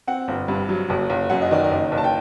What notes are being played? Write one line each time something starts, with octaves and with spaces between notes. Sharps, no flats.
C4 F#5
G1
G2
F#3
F#1
F#1
F#2 F#5
D#5
D#3 D5
D#5
F#1
F#1
A5
G5